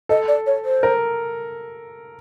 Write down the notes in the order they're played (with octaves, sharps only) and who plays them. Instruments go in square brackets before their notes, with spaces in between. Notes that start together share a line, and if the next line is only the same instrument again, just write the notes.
[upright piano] A4 [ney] D#5
[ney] D5
C#5
C5
[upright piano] A#4